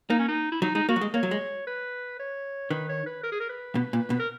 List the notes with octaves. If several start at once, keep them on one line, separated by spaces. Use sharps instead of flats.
A#3 D#4
C#4
D#4
E4
F#3 D#4
G#3 D#4
A#3 F#4
F#3
G#3
A#3 C#5
F#3
G#3
B4
C#5
D#3 B4
C#5
B4
A#4
G#4
A#4
B4
B2
A#2
B2
A#4